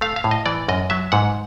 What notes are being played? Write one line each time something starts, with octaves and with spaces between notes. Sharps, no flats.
A3 F5
F5
A2
D#5
E3 D5
F#2 D#5
F#3 E5
G#2 F#5